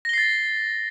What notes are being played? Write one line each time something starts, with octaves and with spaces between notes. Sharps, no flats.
A6 A#6 C7 G7